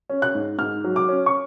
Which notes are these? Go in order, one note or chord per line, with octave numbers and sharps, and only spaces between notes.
C#4
F#6
G#2
G#2 F6
F#3
D6
C#4
C#6